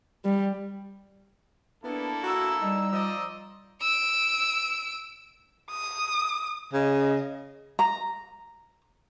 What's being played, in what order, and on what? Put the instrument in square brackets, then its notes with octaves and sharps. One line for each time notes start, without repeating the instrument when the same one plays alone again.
[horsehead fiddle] G3
[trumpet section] A#3 E4 A4 [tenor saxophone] B3 [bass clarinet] D4
[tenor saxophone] F#4 [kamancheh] A#5 E6
[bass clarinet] G3 [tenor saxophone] D#4
[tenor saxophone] F3 [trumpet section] C5 D5 D#5
[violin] E6 D7
[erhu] D#6
[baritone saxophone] C#3 [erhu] D#5
[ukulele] A#5